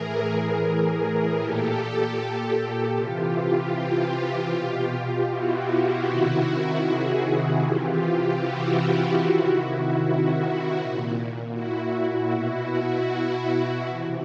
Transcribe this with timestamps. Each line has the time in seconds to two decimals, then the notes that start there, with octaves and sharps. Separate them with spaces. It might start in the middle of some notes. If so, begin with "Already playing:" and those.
Already playing: A2 E3 G#4 A#4
1.37 A#2 G4 A4
2.94 C3 E3 F4 G4
4.50 B2
5.28 E4 F#4
6.06 C3 D#3
6.84 F#4 G#4
7.63 C3 E3 F4 G4
8.41 E4 F#4
9.19 C3 D#3
10.75 A#2
11.53 E4 F#4
12.31 B2
13.88 C3 E3